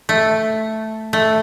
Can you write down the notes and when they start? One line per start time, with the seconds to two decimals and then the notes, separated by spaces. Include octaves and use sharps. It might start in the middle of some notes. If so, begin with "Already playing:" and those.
0.09 A3
1.13 A3